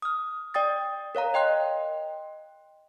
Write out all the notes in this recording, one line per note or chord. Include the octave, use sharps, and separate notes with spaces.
D#6 F6
D5 G5 D#6 A6
A#4 C#5 F5 A#5
D#5 G5 C6 F#6